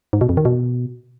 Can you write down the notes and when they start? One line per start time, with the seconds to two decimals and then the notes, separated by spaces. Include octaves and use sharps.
0.13 G#2
0.21 B2
0.29 F2
0.37 D#3
0.45 B2